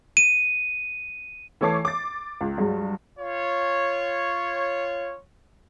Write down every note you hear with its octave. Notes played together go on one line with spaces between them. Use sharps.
D#7
E3 A3 C#5 A5 D6 C7
D6 A6
C#2
G2 F#3 G#3
F4 C#5